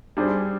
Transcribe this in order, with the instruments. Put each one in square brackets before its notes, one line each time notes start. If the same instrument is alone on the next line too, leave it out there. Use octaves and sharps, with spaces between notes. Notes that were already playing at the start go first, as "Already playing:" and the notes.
[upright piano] G3 D4 G#4 C5